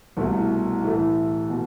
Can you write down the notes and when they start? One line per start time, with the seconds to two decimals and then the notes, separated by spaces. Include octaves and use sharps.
0.17 C2 B2 A3 E4
0.83 A2 E3 A3 E4 A4
1.50 B2